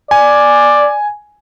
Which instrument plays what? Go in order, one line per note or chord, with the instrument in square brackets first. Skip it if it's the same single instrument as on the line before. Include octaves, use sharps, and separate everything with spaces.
[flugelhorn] D5 [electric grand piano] G#5